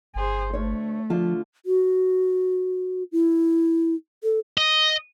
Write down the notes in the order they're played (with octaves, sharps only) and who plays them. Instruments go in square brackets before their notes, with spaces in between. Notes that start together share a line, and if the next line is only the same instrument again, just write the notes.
[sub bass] G1 [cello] G#4 C5
[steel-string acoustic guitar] D2 C#5 [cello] A3
[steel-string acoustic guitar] D3 F4 A5 [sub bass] F3
[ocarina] F#4
E4
A4
[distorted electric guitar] D#5